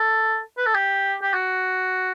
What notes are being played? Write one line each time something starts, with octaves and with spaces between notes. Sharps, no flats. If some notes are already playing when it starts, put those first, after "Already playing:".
Already playing: A4
B4
A4
G4
G4
F#4